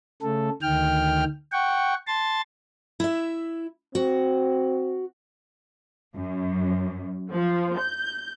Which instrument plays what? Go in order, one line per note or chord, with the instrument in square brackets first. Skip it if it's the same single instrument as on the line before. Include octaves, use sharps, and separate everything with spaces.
[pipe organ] C#3 A3 A4
D2 D#3 G5 F6
F#5 G5 C#6
A5 C6 A6
[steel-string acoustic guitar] E4 E5
[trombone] C4 [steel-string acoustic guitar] F#4
[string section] F#2
F3
G6